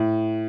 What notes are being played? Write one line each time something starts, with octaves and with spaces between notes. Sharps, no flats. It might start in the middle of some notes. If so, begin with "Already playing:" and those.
Already playing: A2